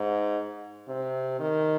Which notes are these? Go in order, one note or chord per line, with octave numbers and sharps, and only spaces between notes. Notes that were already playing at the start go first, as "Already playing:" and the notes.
Already playing: G#2
C3
D#3